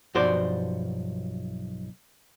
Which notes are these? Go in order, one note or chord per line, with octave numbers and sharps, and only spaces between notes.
B1 G2 F3 F#4 C5 D5